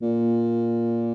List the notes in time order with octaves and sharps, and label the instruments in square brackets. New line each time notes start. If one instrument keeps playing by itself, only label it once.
[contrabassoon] A#2